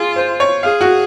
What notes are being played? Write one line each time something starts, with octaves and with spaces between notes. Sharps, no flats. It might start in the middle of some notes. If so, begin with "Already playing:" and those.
Already playing: F4 G#4
C5
C#5
G#4 F5
F#4